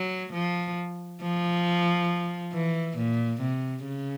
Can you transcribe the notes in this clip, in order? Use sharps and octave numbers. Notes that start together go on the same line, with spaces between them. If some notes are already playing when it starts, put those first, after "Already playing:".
Already playing: F#3
F3
F3
E3
A#2
C3
C#3